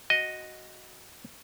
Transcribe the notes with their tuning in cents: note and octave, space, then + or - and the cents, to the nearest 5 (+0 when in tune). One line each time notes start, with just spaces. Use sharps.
F#4 -5 D#5 +0